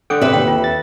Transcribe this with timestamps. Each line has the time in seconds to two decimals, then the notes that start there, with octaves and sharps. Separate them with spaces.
0.10 D3 A4 F#5 G5 D6
0.21 C3 B4 E5
0.33 D#2 G5
0.48 F4
0.64 A6